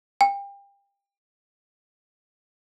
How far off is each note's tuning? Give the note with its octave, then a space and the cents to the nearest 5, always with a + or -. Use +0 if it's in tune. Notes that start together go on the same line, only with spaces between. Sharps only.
G5 +30